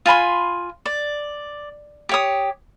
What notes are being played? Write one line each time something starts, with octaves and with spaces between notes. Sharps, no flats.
F4 G#5 B5 C6
D5
G4 C#5 D#6